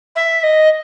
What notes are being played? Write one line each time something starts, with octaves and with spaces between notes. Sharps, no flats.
E5
D#5